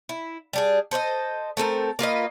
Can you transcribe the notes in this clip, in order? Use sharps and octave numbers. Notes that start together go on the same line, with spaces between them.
E4
G3 D4 G#4
A4 C5 D5 D#5
A3 C4 A4 A#4
A#3 F4 B4 D#5